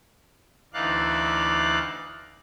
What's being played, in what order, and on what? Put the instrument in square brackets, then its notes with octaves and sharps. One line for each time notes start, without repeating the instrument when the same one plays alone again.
[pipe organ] D2 E3 D#4 D5 F5 F#6